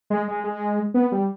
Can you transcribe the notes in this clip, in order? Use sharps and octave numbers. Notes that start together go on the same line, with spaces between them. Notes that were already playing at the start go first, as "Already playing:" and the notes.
G#3
G#3
G#3
B3
G3